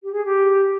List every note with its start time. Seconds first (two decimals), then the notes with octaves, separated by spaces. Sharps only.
0.03 G4
0.13 G#4
0.24 G4